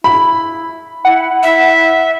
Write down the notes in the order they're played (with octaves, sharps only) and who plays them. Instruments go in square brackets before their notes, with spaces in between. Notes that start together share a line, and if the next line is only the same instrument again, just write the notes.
[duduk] E4 [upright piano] B5
[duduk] E4 [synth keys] F#5
[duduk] E4 [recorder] E5